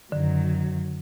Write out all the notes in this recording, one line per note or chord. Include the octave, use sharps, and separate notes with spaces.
F#2 D3 D#3 F#3